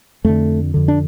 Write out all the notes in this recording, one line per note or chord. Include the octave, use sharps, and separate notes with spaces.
F2 D3 A3
F2 D3
D4